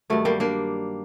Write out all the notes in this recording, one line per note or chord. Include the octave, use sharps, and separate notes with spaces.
G2 D#3 F#3 A3
G3 A#3
A#3 D4